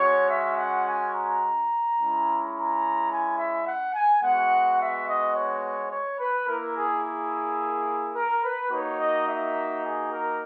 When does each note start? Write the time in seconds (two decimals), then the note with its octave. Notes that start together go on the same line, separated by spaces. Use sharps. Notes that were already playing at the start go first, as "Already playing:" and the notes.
Already playing: G#3 C#4 F#4 C#5
0.30 E5
0.58 F#5
0.86 G#5
1.14 A#5
1.98 G#3 C#4 E4
2.54 A#5
3.10 G#5
3.38 E5
3.66 F#5
3.94 G#5
4.22 G#3 B3 F#4 F#5
4.79 E5
5.07 D#5
5.35 C#5
5.90 C#5
6.19 B4
6.47 A#3 E4 A#4
6.75 G#4
7.04 G#4
8.15 A#4
8.43 B4
8.71 A#3 D#4 F#4 C#5
9.00 D#5
9.27 E5
9.84 G#4
10.12 A#4